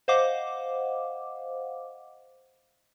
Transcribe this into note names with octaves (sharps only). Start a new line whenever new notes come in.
C5 D#5 F5 F#5 D6